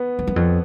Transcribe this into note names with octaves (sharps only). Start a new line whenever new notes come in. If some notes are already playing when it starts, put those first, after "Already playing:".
Already playing: B3
F2
F#2
F2